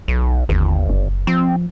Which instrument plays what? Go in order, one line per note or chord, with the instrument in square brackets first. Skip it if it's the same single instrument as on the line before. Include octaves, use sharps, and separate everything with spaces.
[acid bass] B1
[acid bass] G1 [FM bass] D#2
[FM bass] F#1
[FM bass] F3 [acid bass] C4